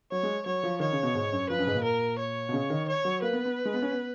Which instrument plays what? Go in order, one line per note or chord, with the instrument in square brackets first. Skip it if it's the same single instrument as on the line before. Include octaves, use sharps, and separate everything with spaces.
[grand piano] F#3 [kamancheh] C#5
[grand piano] G#3
[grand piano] F#3 [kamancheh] C#5
[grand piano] F3
[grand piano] D#3 [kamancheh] C#5
[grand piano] C#3
B2
G#2
F#2
[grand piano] F3 [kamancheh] B4
[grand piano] F#2
G#2
A#2
[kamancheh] A#4
C#5
[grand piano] B2
C#3
D#3
[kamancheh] C#5
[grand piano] F#3
[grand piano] A#3 [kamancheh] B4
[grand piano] B3
B3
G#3
B3
C#4
B3